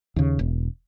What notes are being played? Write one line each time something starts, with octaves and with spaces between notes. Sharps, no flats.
D#2 C#3
E1